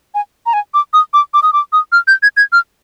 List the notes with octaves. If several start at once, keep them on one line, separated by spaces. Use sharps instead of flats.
G#5
A#5
G#5
D6
D#6
D6
D6
D#6
D6
D#6
F6
G6
G#6
G#6
F6